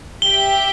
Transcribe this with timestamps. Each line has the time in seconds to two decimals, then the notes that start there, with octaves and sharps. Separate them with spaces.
0.22 G4 E5 G5 G7